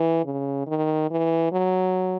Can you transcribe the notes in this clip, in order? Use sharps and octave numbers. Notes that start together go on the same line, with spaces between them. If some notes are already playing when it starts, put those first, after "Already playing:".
Already playing: E3
C#3
D#3
E3
F#3